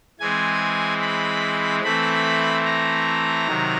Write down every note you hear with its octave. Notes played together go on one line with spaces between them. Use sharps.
E3 G#3 C4 G#5
B5
E3 A3 C4 B5
A#5
C3 D#3 F#3